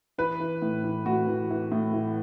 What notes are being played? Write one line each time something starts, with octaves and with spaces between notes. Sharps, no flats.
E3 B4
E3
A2
E3
A2 F#4
E3
E3
A2
E3